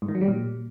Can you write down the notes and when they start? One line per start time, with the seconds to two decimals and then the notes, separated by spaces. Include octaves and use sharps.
0.02 G#2
0.08 D#3
0.15 F#3
0.21 G3
0.28 A#2